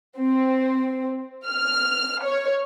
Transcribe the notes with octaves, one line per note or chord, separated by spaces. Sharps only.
C4
F6
C#5